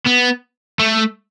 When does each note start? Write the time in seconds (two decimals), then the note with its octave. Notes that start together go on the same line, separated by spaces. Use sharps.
0.06 B3
0.79 A3